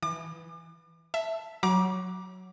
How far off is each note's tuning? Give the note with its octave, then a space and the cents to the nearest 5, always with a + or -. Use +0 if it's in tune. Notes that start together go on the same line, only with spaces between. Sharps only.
E3 +0 D6 +40
E5 +0 A5 +0
F#3 +0 A#5 +35 D6 +0